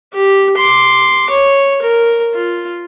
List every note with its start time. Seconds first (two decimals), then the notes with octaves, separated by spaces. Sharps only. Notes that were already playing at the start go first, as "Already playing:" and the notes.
0.14 G4
0.58 C6 D6
1.30 C#5
1.82 A#4
2.34 F4